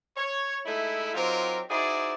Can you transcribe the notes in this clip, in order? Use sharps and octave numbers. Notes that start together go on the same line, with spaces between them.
C#5
G#3 A3 D#4 E4
F#3 C4 D#4 F4 G4 A#4
D#4 E4 F#4 G#4 C5 D5